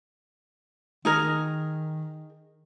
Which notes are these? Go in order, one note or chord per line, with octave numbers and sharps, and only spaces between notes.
D#3 D#4 G#4 A#4